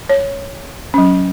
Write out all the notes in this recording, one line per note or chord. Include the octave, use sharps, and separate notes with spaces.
C#5
F#3 C#4